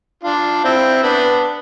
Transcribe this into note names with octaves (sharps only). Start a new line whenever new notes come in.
D4 F4
C4 E4
B3 D4